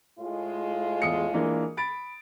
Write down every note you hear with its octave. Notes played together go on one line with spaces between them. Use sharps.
A2 G#3 F4
E2 D#6 C#7
E3 A#3 D4
B5 A6 D7